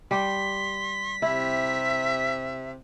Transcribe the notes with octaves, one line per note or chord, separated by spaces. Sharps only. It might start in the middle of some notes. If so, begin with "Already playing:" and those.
G3 G4 C6 B6
C3 E4 E5